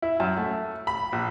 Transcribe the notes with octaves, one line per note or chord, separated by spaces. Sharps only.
E4
F#2
A3
B5
A#1